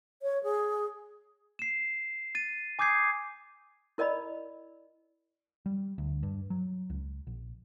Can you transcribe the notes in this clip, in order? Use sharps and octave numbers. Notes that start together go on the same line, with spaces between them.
C#5
G#4
C7 E7
A6 D#7
G#5 D6 D#6 G6 G#6 C7
E4 A#4 D5 D#5 B5
G3
D2
G2
F#3
C#2
A#1